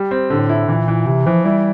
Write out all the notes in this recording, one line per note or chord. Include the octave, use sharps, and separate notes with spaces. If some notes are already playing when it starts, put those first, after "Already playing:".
Already playing: G3
C4
A2 D3
E4
A#2 E3
E3
C3 E3
E3 F3
G3 E4